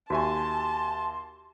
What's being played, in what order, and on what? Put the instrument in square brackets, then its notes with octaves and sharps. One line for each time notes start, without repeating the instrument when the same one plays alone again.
[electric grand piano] D#2 E5 G#5 [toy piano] F#4 G4 [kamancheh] A5 [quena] C6